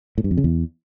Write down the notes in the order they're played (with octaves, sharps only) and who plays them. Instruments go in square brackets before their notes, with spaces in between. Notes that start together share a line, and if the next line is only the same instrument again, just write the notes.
[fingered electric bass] A2
G2
F2
C#3
E2